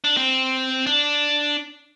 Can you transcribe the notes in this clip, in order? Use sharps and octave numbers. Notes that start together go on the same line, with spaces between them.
D4
C4
D4